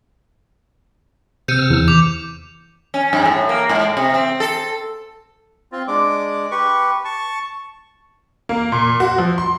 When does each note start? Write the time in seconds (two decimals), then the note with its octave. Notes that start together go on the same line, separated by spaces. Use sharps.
1.48 C3 E6 F6 G6 C#7 D#7
1.70 E2
1.88 D6 F7
2.94 C#4
3.13 G2
3.26 A2
3.49 A#3
3.69 G#2
3.97 C3
4.14 C4
4.40 A4
5.72 C4 F4
5.88 G#3 D4 D6
6.51 G4 B4 C#6
7.05 A5 C#6
8.49 A#3
8.72 A#2
9.00 F#4
9.18 F3
9.38 C6